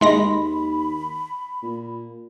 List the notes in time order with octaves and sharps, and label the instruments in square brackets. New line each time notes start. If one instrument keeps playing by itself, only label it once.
[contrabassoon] D#2 [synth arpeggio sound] G#3 D#4 A#6 [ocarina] B5 [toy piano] C6
[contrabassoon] A#2